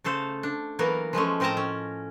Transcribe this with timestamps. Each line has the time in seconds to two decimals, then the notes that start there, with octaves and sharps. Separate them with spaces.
0.04 C#3 A3 A4 C5 F5
0.43 D4
0.79 E3 F#3 A#3 B3 A#4
1.13 F3 G#3 A3 C#4
1.40 A2 C4 A#4 D#5 A5 A#5
1.57 C#4